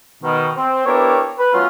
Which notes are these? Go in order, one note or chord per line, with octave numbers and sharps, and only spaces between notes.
B2 D#3
C4
B3 D4 E4 G4 A#4 C#5
B4
F#3 A3 B3 C#4 F4